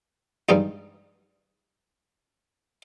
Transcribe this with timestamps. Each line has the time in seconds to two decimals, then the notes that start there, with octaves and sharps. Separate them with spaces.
0.49 G2 G3 G#3 D#4